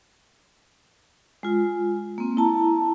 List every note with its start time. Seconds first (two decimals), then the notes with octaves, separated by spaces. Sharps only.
1.43 G#3 F4
2.18 A#3 C4
2.37 E4 A5 A#5